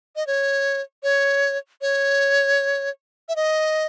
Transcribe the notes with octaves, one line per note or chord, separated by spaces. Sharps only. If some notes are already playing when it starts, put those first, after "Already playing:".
D#5
C#5
C#5
C#5
E5
D#5